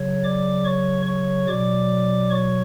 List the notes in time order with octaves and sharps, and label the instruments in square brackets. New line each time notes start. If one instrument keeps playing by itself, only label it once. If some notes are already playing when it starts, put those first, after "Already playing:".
Already playing: [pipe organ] C#3 F#3 C#5
D5 D6
C#5 C#6
C#5 C#6
B2 F#3 D5 D6
C#5 C#6